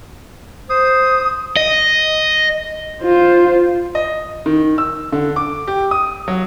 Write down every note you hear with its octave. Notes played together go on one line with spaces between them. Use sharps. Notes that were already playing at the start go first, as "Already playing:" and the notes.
C5 D#6
D#5
F4 C5
D#5
D#3
E6
D3
D6
G4
D#6
F#3